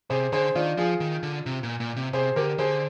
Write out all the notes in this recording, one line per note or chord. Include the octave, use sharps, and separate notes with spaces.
C3 G#4 C5
D3 G#4 C5
D#3 D4 F4
F3 F4 G#4
D#3
D3
C3
A#2
A#2
C3
C3 G#4 C5
D3 G4 A#4
D3 G#4 C5